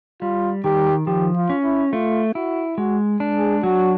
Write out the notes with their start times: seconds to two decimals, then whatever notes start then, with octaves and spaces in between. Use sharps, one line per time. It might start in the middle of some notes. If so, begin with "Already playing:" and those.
0.22 G3 F4
0.64 D#3 G4
1.07 F3 G4
1.36 F4
1.50 C#4
1.64 E4
1.92 A3 F4
2.35 E4 F#4
2.77 G#3 F#4
3.20 D4
3.35 G#4
3.63 F#3 F#4